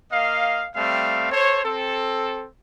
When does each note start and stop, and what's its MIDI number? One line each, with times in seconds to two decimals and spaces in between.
0.12 0.65 58
0.12 0.65 75
0.12 0.65 77
0.75 1.30 55
0.75 1.30 57
0.75 1.30 60
0.75 1.30 77
1.31 1.61 69
1.31 1.61 72
1.31 1.61 73
1.64 2.46 60
1.64 2.46 69